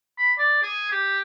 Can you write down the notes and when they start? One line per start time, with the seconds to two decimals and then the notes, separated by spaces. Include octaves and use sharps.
0.18 B5
0.39 D5
0.63 G#4
0.92 G4